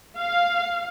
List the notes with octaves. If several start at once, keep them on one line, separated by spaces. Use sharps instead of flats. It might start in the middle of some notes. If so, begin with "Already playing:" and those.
F5